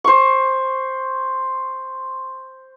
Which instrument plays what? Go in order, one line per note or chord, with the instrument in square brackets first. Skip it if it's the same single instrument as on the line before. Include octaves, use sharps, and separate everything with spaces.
[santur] C5 C#6